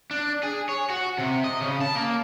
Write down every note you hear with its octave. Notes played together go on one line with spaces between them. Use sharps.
D4
G#4
C#5
F#4
C3
D#5
C#3
A5
A#3